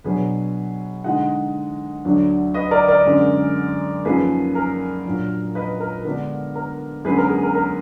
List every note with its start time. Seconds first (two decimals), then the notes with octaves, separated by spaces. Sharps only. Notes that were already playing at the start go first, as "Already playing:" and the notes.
0.04 B2 F#3 D4 G#4 B4
1.04 D3 G#3 D#4 D#5 F#5
2.05 D2 D3 F#3 D4
2.54 B4 D#5
2.71 A#4 D5
2.88 A#4 D5
3.06 F#2 D3 G#3
4.05 F#2 F3 A#3 D#4 G#4 B4
4.55 A#4
5.05 A#2 F#3 D4
5.55 B4 D#5
5.80 A#4
6.05 D3 G#3 B3 D4 A#4
6.55 A#4
7.05 F#2 D3 G#3 B3 G#4 B4
7.18 A#4
7.30 G#4
7.43 A#4
7.55 A#4